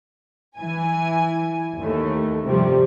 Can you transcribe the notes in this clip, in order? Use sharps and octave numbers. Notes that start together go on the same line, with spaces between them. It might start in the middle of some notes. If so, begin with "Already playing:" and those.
E3 G#5
D#2 A3
G2 C3 F3 G3